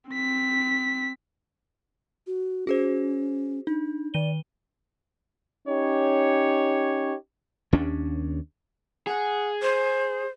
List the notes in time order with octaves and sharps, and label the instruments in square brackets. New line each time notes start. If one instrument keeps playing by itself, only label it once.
[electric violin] C4 B6
[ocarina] F#4
[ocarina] C#4 [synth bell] F#4 G#4 C5
[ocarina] D4 [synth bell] D#4
[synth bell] D#3 D#7 G7 [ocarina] D5
[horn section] C#4 D#4 G4 C#5
[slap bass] D#2 C#4 D4
[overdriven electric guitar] G#4 [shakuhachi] F#5
[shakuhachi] C5